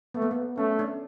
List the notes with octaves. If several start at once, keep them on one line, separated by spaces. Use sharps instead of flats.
A3 B3
A#3
B3
A3 C#4
D4